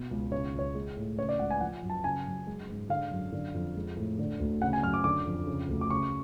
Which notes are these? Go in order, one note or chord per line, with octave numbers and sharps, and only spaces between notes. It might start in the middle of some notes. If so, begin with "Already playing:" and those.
Already playing: B2
C#2
C#3 C#5
C#2 C#5
G#3
A2
C#3 C#5
D5
C#2 F#5
G#5
F3 F#5
F#2
A5
C#3 G#5
F#2
G#3
G#2
D3 F5
F#2
D3
F2
G#3
A2
D3
D2
C#3 F#5
G#5
F#2 F6
D6
D3 D6
F2
C#3
D2
D6
C#3 C#6